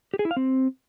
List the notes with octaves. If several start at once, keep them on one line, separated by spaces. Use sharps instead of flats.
G4
G#4
E4
F5
C4